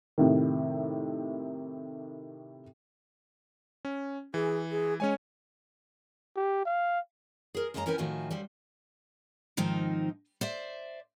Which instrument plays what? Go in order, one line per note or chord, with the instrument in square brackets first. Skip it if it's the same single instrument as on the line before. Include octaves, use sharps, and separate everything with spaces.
[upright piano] A2 C3 D#3
[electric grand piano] C#4
[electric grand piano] E3 [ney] G#4
[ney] G#4
[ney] G#3 [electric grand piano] C#4 C#5 G#5
[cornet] G4
F5
[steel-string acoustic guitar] G#4 A#4
F#2 G#3 A#3 D#5 A5 A#5
C#4 E4 A#4 B4 G5 G#5
A2 D#3 F3 A3 F#4 G#5
D3 F3 G3
G#2 D#3 F3 C4 D#4
C5 D5 E5